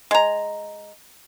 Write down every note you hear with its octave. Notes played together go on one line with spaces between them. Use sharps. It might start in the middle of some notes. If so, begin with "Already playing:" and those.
G#3 A#5